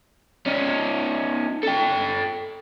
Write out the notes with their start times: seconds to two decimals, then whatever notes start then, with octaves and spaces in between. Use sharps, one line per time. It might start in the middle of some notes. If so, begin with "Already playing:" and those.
0.46 C#4 D#4
1.63 A4 G5